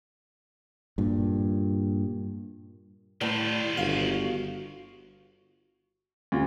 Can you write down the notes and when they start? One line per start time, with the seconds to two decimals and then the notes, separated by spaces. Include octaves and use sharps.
0.98 G2 A#2
3.21 A2 D#3 G3 F4
3.77 G1 F#4 F5
6.32 D2 C#4 F4 G4